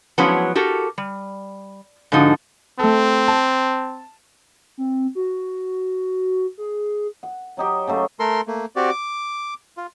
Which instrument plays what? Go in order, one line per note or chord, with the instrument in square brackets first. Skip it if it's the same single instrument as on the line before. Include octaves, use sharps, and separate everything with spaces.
[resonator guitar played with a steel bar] F3 F#3 G#3 B3 C#4 E4
F#4 G4 A4 A#4
G3
G#2 D3 F3 D#4 F#4
[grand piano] A3 A4 [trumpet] C4
[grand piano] A5
[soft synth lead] C4
F#4
G#4
[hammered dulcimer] F#5
F#3 D#4 G4
C#3 F#3 A3
[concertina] A3 A4 A#4 C6
A3 A#3
C4 F#4 G4 D5
D6
F4